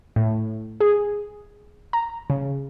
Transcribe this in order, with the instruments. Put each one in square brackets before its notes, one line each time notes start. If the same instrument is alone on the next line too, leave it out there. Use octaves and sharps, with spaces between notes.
[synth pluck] A2
G#4
A#5
C#3